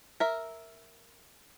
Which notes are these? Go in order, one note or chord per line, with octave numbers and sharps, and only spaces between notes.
A#4 E5